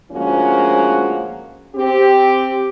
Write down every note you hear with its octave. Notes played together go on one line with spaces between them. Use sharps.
D2 F3 G#3 A#3 C#4 F#4
C4 G4